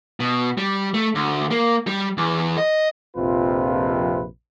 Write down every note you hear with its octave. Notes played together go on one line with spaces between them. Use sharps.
B2
G3
A3
D2
A#3
G3
E2
D#5
A#1 F2 C3 F4 B4